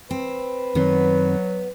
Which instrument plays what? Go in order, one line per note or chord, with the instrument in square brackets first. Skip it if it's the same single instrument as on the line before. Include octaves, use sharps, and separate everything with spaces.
[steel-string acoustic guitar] C4 [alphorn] B4
[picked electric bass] F#2 D#3 C4 [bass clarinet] F#3 [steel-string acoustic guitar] B3